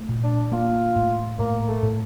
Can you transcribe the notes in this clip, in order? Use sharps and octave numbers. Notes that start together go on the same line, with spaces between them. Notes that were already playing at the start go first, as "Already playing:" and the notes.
Already playing: A3
A#2
D4
A#3 F4
A2
A2 A#3
A3
A2